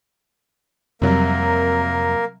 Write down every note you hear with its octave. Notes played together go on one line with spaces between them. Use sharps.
F2 C3 F#3 G3 A#3 A#4